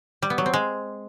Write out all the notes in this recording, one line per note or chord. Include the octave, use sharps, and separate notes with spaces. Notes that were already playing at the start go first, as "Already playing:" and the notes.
G3
B3
F#3
C4
G#3